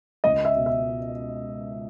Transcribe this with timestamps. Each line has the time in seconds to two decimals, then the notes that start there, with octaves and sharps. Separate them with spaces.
0.24 C#2 D#5
0.45 E5
0.55 B2
0.66 E5